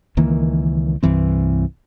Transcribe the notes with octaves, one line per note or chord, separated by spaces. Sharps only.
C#2 D#3 E3 A#3
C2 G2 E3 C4